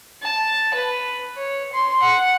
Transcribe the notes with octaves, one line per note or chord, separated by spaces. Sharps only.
A5
B4
C#5
C6
F#5